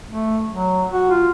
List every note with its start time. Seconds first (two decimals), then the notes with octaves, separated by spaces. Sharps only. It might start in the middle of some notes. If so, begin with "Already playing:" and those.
0.11 A3
0.49 F#3
0.90 F#4
1.11 F4